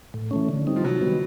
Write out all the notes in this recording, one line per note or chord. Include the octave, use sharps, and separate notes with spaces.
A2
E3 A3 C#4
D3
G3 C4 D#4
F3
C3 F#3
D#3 G3 B3